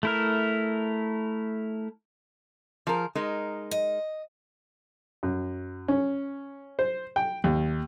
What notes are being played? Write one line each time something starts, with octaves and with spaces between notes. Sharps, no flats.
A3 E4 A#4
F3 G#4 A#4
G#3 D#4 A#4
D#5
F#2
C#4
C5
G5
D#2